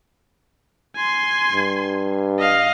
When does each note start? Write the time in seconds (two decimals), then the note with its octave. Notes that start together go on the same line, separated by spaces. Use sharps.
0.96 G#5 C6
1.52 G2
2.39 D#5 F5